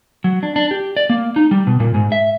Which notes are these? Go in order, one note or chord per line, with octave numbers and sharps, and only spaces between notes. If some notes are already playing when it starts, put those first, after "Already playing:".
F#3
D4
D4
G4
D5
A#3
D#4
G3
B2
A#2
G#2
E5